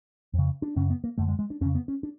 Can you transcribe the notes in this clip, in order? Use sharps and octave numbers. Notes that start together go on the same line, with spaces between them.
F2
C#3
D4
F#2 C#3 C#4
B3
A#3
F#2 D3 A3
G#3
G#3
D4
F2 C#3 C#4
B3
C#4
D4